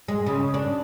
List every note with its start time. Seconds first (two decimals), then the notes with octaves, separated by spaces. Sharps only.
0.08 G#3
0.26 C#3
0.54 D4